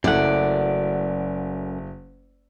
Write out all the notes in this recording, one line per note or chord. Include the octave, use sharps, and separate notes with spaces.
F#1 F#2 A3 E4 D5 F#5